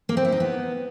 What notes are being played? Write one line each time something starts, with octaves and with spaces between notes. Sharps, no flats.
A#3
C4
E4
D#4
B3